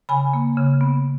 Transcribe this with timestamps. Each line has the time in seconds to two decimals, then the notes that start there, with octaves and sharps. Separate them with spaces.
0.09 C#3 G#5 B5
0.33 A#3
0.57 C#3
0.81 B3